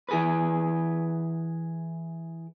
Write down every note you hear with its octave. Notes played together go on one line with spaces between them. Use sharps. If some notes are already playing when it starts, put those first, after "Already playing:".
E3 G#4 B4